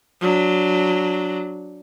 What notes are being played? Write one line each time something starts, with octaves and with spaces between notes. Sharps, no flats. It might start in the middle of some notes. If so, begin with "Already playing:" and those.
F#3 D4